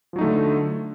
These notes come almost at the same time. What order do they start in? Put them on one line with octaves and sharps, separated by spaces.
F3 F#3 D#4 A3 D3